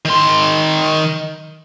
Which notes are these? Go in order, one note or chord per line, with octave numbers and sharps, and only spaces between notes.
D#3 C6